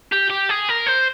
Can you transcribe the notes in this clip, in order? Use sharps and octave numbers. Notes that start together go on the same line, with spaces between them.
G4
G4
G#4
A#4
C5